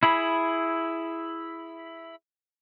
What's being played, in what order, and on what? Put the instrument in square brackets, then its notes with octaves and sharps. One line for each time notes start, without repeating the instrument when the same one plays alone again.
[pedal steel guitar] E4 G#4 B5